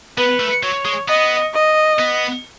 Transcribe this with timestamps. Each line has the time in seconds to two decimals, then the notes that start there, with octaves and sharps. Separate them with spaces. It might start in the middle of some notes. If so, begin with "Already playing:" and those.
0.18 B3 B4
0.40 A3
0.63 F#3 C#5
0.85 G#3
1.08 B3 D#5
1.54 D#5
1.99 B3